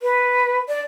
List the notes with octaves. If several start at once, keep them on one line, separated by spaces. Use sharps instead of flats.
B4
D5